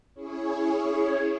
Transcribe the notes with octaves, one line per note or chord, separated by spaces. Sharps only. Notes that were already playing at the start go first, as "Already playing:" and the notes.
C#4 E4 G#4 C#5